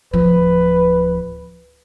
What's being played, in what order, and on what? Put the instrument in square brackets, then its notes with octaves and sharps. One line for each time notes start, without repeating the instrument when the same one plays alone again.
[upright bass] D1 F3 [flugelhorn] B4